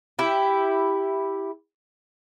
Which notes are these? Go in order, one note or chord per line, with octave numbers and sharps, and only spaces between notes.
E4 G4